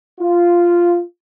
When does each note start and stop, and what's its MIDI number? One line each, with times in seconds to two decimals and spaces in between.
0.20 1.02 65